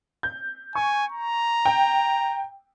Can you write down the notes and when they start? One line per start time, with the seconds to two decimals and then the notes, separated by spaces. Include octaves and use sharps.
0.23 G6
0.75 G#5 C#6
1.12 A#5
1.65 G5